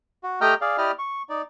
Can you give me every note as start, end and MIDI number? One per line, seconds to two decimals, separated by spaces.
0.23 0.40 66
0.41 0.54 57
0.41 0.54 67
0.41 0.54 75
0.41 0.54 79
0.41 0.54 82
0.41 0.54 89
0.61 0.77 68
0.61 0.77 74
0.61 0.77 77
0.78 0.92 64
0.78 0.92 67
0.78 0.92 74
0.78 0.92 75
0.78 0.92 89
0.99 1.22 85
1.29 1.42 63
1.29 1.42 74